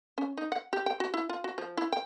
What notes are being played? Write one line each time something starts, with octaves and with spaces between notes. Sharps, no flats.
C#4
D#4
F#5
G4
G5
F#4
E4
F4
F#4
F3
E4
G5